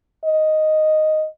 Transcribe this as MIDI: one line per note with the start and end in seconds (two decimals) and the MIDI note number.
0.25 1.27 75